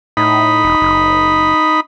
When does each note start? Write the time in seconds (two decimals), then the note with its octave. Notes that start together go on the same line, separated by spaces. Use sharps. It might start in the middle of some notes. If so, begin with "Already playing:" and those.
0.17 A2 D#4 B5
0.64 E1
0.81 F#1